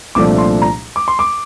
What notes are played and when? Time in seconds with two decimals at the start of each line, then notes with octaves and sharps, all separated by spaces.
0.15 C2 A#2 F3 A3 D4 D6
0.38 C6
0.62 A#5
0.96 D6
1.08 C6
1.19 D6